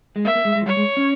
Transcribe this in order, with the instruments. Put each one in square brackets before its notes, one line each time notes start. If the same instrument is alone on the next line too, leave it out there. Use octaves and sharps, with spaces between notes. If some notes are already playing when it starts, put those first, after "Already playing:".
[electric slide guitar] G#3
[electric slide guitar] A#3 [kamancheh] E5
[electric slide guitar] A#3
G#3
G#3
F3
[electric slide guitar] G3 [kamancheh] C#5
[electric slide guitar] G#3
C#4